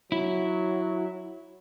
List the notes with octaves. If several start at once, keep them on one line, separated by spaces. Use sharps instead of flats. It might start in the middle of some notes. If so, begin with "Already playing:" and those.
F#3 E4